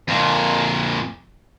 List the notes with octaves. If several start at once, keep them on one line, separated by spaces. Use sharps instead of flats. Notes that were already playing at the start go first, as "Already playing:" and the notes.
F2 A#2